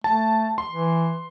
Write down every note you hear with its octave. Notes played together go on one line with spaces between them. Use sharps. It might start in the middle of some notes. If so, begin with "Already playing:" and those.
A3 A5
C6
E3